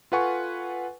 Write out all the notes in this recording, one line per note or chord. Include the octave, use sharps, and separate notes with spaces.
F4 A4 B4 F#5 G#5 C#6